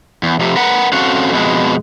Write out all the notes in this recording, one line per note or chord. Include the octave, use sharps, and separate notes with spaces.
E2
F2 C3
A#4 B4 F#5
C4 C#4 F#4 A4 F5 F#5
F2 B2 G#3